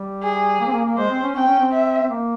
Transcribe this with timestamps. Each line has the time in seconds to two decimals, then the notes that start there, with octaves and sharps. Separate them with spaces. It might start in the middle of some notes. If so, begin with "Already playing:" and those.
Already playing: G3
0.23 G#4
0.61 A#3
0.67 C4
0.73 A#3
0.85 A#3
0.97 G#3 C5
1.11 C4
1.23 C#4
1.36 C4 G5
1.48 C#4
1.60 C4
1.72 E5
2.03 C4
2.10 A#3